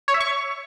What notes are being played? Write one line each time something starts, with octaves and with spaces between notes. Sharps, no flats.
C#5
E5
C#6